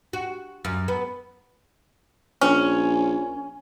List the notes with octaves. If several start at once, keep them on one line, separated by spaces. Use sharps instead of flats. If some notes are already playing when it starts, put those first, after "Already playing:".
F#4
F#2
B3
A#1 C#4